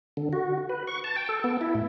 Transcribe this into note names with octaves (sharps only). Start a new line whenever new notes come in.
D3
F#4
B4
C#6
A5
G5
A4
B3
E4
A2